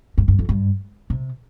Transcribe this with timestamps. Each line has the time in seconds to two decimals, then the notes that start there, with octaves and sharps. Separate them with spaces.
0.18 G2
0.28 G2
0.39 F2
0.49 G2
1.10 C3